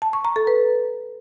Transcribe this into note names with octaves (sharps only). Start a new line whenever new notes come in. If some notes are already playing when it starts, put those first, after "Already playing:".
A5
C#6
A#5
A4
B4